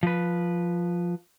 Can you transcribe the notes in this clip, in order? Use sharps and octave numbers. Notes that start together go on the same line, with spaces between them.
F3 B4